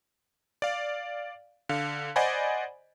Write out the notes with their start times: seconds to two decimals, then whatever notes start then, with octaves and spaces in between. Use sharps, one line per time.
0.62 D5 F5
1.69 D3 F5
2.16 C5 D5 D#5 F#5 G#5 B5